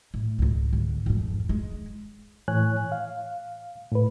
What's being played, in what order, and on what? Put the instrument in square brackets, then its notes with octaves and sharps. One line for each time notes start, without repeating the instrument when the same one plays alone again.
[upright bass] A2
C#2 G#2
G#2 D3
F2 G#2
G#3
[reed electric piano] A2 E3 C#5 G#5 F#6
F5
A2 B4